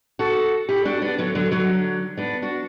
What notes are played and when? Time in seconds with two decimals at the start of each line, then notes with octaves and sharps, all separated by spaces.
0.19 F#4 A4
0.69 E4 G4
0.85 D4 F#4
1.02 B3 D4
1.18 D3 F#3
1.35 D3 F#3
1.51 D3 F#3
2.17 B3 D4
2.42 D4 F#4